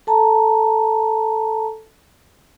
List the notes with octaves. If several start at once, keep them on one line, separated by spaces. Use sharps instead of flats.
A4 A5 A#5